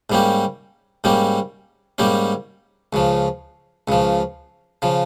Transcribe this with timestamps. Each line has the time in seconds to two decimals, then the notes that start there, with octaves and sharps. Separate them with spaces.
0.10 G#2 G3 A#3 C#4 G4
1.04 G#2 G3 A#3 C#4 G4
1.98 G#2 G3 A#3 C#4 G4
2.93 C#2 C#3 F3
3.88 C#2 C#3 F3
4.82 C#3 F3